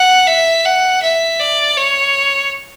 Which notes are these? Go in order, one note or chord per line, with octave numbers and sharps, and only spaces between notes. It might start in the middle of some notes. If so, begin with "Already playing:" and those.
Already playing: F#5
E5
F#5
E5
D5
C#5